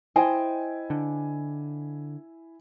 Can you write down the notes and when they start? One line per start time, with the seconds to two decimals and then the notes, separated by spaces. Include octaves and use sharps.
0.16 E4 C5 D#5 G5 G#5
0.90 D3